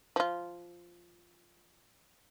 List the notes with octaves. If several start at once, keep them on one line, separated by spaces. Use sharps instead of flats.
F3 F4